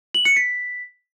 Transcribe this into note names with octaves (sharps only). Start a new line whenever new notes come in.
F#7
C#7
B6